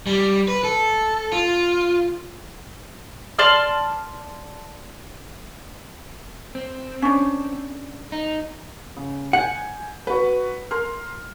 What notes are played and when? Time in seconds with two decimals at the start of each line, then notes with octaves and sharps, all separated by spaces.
0.07 G3
0.48 B4
0.64 A4
1.33 F4
3.39 D5 A5 C6 F6
6.55 C4
7.02 C#4 D4
8.12 D#4
8.96 C#3
9.33 F#5 G#5 G6
10.07 F#4 B4
10.71 A#4 C6 F6